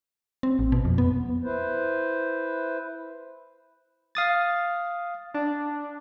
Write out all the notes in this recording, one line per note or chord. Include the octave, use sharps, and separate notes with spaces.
C4
A1
B2
F2
B3
E4 B4 C5
F5 D#6 A6
D4